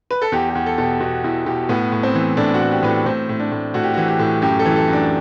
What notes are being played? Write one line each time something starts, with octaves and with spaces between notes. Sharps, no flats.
B4
A4
E2 G4
G4
E2
A4
B2 A4
G4
B2 F#4
E2 E4
B2 G4
A2 B3
A2
C4
E3
A2 D4
F#4
A2
G4
A2 B4
A4
A2 C4
A2
D4
A2
A2 F#4
G4
E3 F#4
G4
A2
F#2 G4
A4
E3
A4
F#2
D4